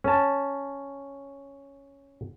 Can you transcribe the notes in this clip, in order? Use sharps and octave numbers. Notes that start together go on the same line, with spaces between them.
C#4 A5